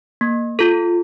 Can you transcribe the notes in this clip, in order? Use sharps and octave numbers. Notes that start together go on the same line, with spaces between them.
A#3
F4 A4